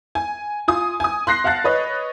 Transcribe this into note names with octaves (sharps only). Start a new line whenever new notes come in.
G#5
F4 G#5 D#6
G#5 D#6
C6 F#6 A#6 C7
F5 F#5 A5 F#6 A6
B4 C#5 D#5